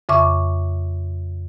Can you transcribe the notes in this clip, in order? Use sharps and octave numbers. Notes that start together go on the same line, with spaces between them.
F2 C#3 E5 C#6 D6